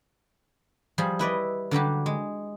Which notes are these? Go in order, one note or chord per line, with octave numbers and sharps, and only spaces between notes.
F3 G3 G#4
E4 B4 D5 D#5
D3 F#3 G3 G4
G#3